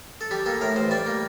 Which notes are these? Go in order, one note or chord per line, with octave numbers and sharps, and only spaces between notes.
A4
G3 G4
A#3 A4
A2 A#4
A1 C5
G3 D5
A#3